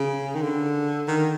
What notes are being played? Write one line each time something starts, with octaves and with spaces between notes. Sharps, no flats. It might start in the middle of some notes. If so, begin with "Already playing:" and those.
Already playing: C#3
D#3
D3
D#3